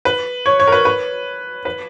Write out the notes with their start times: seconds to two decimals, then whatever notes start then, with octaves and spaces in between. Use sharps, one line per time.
0.05 B4
0.46 C#5
0.60 C#5
0.67 A#4
0.72 B4
0.85 B4
1.65 B4